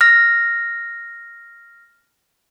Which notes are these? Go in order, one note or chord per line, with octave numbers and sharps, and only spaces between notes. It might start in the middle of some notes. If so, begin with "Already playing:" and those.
F6 A#6